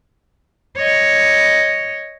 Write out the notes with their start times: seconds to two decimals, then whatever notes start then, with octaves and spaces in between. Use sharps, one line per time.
0.76 C#5 D#5